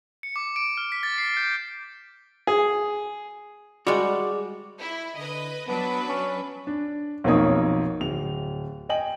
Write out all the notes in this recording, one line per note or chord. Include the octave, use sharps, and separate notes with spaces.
C#7
D6
D7
F6
B6
A6
C7
G6
G#4
G3 G#3 F#4 G#4 D5
E4
D3 B4 D#5
F#3 B3 D4 B4
C#4
D4
B1 F2 A#3 D#4 C#5 D#6
D1 F7
D#5 G5 G#5 F#7